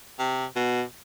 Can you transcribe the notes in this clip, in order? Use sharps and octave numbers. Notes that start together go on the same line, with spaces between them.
C3
B2